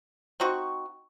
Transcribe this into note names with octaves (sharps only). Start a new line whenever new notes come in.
C4 D#4 F#4 C#6